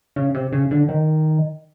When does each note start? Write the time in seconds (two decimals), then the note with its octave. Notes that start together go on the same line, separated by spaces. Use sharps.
0.16 C#3
0.35 C3
0.53 C#3
0.71 D3
0.89 D#3